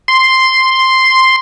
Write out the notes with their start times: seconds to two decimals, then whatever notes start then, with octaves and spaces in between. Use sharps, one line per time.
0.08 C6